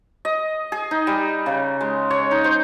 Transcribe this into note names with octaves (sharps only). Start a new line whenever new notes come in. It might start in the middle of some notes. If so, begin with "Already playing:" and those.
D#5
G#4
D#4
G3
C#3
G#3
C#5
D#4
C5